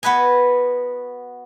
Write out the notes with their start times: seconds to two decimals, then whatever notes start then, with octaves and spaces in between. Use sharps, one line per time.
0.03 B3 F#4 B4 D#5 G#5